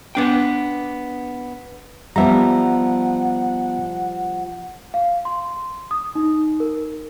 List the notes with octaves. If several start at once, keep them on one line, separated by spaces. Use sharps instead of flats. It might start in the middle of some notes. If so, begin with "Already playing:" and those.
B3 D4 G5
F3 G3 B3 E5 F#5 A#5
F5
C6
D#6
D#4
A#4